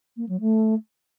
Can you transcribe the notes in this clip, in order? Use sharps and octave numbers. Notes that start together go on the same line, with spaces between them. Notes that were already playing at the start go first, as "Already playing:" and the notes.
A#3
F#3
A3